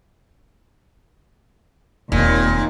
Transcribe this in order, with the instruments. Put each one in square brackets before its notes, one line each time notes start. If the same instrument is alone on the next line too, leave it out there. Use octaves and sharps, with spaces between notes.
[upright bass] E1 C4 [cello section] D#2 [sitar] A#2